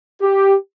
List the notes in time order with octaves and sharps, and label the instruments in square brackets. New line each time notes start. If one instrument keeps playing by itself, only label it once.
[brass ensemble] G4